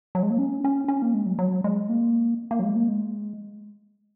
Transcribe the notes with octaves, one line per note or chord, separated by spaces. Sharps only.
F#3
G#3
A#3
C#4
C#4
C#4
A#3
G#3
F#3
F#3
G#3
A#3
A#3
F#3
G#3
A#3
G#3